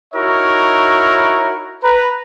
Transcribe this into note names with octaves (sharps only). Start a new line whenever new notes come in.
D#4 E4 F#4 A#4 C#5 E5
B4 A#5